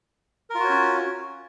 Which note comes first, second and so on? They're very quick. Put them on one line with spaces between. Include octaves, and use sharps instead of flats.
A#4 F4 F#4 C#5 C#4